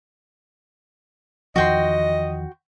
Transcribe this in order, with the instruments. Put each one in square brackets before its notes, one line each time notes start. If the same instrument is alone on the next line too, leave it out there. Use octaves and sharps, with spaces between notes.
[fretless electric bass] E2 D#3 F3 [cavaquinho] F#4 G5 C6 [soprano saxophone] D#5